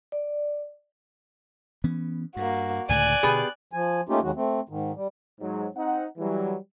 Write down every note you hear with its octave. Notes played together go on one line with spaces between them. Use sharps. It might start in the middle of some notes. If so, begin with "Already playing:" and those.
D5
E3 B3 C#4
G2 A#3 F#4
C#2 A2 D3 D5 G#5 F#6
B2 D3 B3 G4 G#4
F3 G#5
A3 A#3 C#4 D#4 F4 G4
D#2 D#3 F#3 G#3 F#4
A3 C4
G#2 D#3
G3
G#2 F#3 G#3
C4 D#4 F#5
E3 F#3 G3